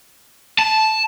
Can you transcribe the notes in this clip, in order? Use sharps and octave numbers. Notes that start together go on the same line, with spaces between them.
A5